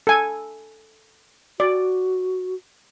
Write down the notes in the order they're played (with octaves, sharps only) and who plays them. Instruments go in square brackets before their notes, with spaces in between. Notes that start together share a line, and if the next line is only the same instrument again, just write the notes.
[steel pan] A4 G#5
[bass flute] F#4 [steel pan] D5